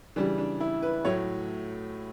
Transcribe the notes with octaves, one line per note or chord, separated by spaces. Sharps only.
C#3 E3 G3 D4
D4
E4
B4
A2 F#3 A3 C#5